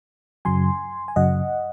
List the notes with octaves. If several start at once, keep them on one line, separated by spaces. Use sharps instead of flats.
F#2 C#3 F#3 G#5 C6
G#5
F#2 C#3 F#3 D#5 F#5